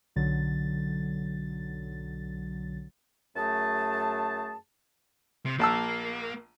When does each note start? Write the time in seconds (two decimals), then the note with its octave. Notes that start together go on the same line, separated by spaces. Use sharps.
0.16 B1 D3 F#3 A6
3.36 F#2 A3 G#4 A5
5.46 C3
5.59 A#1 A#3 A5 E6